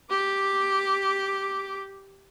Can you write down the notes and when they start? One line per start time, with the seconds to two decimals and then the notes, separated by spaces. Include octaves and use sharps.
0.10 G4 D6